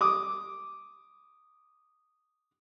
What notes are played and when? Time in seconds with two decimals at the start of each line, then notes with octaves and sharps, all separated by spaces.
0.01 D6 D#6